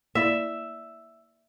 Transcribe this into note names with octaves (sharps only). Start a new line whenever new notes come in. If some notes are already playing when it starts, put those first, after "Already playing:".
A#3 E4 D5 E5